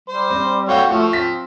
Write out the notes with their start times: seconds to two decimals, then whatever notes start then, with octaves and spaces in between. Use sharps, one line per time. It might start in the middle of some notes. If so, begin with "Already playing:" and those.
0.09 G3 C5
0.30 C4
0.69 F#4 A4 C#5 F5 G5
0.90 F3 A3 C#6
1.13 C4 B6